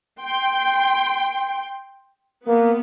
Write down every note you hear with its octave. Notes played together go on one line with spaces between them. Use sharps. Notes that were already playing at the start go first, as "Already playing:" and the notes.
G5 C6
A#3 B3